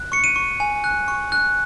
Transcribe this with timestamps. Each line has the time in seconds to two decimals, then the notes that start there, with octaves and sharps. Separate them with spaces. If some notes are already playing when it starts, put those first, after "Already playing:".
Already playing: F#6
0.12 C#6 C#7
0.24 D#7
0.36 C#6
0.60 G#5
0.84 F#6
1.08 C#6
1.32 F#6